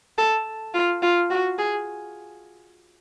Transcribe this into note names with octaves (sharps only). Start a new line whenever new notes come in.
A4
F4
F4
F#4
G#4